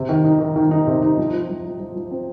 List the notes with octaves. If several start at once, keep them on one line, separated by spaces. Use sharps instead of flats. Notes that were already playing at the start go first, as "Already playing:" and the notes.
Already playing: C3
D#3
D#4
D#3
D#3
D#4
C3
D#4
F3
F3
F3
F3
F3
F3
C4